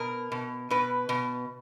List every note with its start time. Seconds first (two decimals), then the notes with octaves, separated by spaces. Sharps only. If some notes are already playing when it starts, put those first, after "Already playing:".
Already playing: B2 A#4
0.32 B2
0.70 B2 B4
1.09 B2